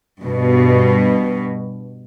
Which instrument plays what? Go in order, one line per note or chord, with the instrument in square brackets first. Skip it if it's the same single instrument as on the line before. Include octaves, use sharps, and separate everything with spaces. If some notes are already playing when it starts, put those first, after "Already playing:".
[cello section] G2 B2